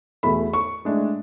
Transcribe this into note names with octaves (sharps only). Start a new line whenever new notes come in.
E2 B2 A3 E4 B5
C#6
A2 G#3 D4